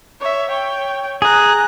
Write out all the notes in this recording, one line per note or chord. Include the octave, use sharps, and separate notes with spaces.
C#5 E5
C#5 G5
G#4 A#5 F#6